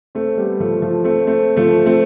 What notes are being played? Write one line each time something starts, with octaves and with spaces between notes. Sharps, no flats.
A3 C4
G3 B3
F3 A3
F3 A3
A3 C4
A3 C4
F3 A3
A3 C4